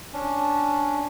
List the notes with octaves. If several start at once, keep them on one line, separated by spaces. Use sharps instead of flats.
C#4 D4